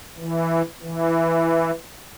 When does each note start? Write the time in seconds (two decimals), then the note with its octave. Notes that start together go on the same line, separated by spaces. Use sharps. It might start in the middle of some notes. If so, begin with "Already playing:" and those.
0.17 E3
0.82 E3